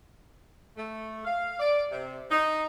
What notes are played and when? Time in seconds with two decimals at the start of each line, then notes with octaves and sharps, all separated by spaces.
0.77 A3
1.25 F5
1.60 D5
1.90 C3
2.30 D#4